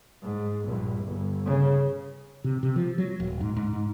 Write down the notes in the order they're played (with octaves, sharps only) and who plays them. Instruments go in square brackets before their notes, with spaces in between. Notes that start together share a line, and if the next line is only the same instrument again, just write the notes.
[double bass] G#2
A#1 G2
G1
C#3
[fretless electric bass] C3
C3
F3
F#3
D#1
G#2
G#2
G#2